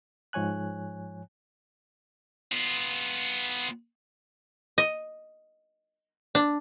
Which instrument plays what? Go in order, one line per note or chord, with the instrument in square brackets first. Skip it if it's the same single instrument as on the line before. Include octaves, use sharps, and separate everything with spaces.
[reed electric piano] G#2 F3 C#5 G#5 F#6
[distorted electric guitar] B3 F4
[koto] D#5
D4